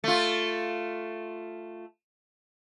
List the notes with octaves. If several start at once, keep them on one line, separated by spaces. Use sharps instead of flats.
A3 F4